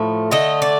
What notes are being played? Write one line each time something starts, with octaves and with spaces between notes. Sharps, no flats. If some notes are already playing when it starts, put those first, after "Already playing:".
Already playing: A2 F3 A3
D3 A3 D#5
D5